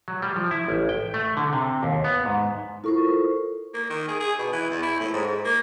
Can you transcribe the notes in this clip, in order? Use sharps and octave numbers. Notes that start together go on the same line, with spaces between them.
F#3
G3
F3
E4
A1
G5
A3
D3
C3
D#2
B3
G#2
E4 F4 A4 A#4 C5 C#6
A#3
D#3
G#4
G#4
B2
E3
E2
E4
A2
G#2
G#2
A#3